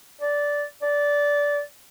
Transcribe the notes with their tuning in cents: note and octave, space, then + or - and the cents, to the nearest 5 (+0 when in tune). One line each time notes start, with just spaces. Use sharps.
D5 -10
D5 -15